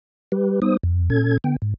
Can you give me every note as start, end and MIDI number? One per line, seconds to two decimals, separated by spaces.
0.32 0.60 55
0.32 0.60 67
0.32 0.60 71
0.62 0.77 55
0.62 0.77 59
0.62 0.77 63
0.62 0.77 72
0.62 0.77 87
0.83 1.09 41
1.10 1.38 46
1.10 1.38 61
1.10 1.38 69
1.10 1.38 92
1.44 1.56 50
1.44 1.56 59
1.44 1.56 79
1.62 1.74 44